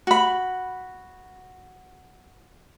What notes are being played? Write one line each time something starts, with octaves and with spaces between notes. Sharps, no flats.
F#4 B5